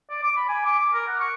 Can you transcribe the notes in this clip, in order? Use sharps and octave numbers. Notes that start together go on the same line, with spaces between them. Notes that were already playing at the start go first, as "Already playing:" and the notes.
D5
D6
B5
G#5
D6
D6
A#4
F#5
C#6